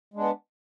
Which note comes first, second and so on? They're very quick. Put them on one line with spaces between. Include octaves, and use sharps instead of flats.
G#3 D4 B3